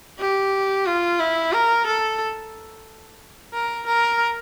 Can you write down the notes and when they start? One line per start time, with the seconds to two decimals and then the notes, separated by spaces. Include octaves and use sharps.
0.19 G4
0.86 F4
1.19 E4
1.52 A#4
1.86 A4
3.53 A#4
3.86 A#4